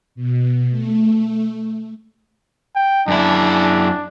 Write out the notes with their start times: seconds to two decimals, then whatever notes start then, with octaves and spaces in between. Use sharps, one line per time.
0.15 B2
0.70 A3
2.76 G5
3.08 F#2 D4 E4